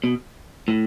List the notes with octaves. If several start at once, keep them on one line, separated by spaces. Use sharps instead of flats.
B2
A2